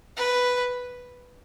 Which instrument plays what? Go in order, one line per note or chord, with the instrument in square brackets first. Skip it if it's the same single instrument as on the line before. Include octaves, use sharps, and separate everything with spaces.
[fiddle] B4